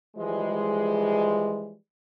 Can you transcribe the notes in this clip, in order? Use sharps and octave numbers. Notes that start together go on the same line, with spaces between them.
E3 F3 G3 G#3